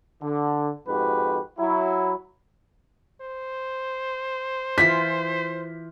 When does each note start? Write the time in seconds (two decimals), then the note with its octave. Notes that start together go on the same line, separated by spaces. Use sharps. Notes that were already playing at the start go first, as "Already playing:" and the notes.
0.22 D3
0.87 F2 G#2 F#4 G4 B4
1.59 F#3 E4
3.21 C5
4.78 E3 F4 G#5 B6